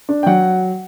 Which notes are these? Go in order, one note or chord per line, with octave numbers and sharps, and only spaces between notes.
D4
G5
F#3 F#5